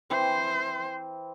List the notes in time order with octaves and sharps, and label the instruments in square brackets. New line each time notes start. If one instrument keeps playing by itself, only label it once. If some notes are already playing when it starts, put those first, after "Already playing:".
[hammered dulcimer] E3 C4 [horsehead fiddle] C5